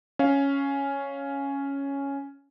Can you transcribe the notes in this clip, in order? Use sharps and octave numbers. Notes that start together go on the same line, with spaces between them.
C#4 F5